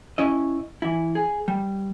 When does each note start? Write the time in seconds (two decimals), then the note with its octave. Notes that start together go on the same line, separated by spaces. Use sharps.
0.18 C#4 E4 D#5
0.82 E3 E4
1.15 G#4
1.48 G3